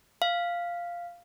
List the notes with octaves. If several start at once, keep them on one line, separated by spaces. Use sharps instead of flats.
F5